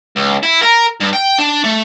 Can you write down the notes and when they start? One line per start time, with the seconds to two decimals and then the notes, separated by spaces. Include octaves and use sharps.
0.16 C#2
0.43 E4
0.62 A#4
1.01 G2
1.13 G5
1.39 D4
1.64 A3